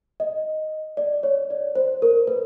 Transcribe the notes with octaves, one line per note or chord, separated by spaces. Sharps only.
D#5
D5
C#5
D5
C5
A#4
B4